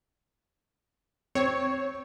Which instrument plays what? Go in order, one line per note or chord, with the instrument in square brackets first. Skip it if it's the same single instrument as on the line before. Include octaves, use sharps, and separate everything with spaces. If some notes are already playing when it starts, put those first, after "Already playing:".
[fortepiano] C4 [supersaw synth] C#5